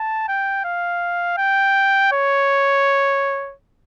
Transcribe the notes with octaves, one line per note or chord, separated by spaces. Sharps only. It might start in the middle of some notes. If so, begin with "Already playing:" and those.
Already playing: A5
G5
F5
G5
C#5